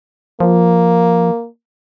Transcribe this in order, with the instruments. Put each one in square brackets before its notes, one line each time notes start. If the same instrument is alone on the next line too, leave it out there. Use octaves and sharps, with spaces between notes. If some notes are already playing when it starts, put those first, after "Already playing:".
[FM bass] F3 [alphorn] A#3